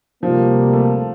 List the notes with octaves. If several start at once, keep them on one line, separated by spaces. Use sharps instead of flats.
D2 C3 F3 G3 A#3
A3